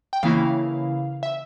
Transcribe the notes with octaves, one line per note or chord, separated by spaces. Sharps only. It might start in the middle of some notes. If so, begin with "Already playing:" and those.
G5
C#3 E3 A#3 E4 F5
E5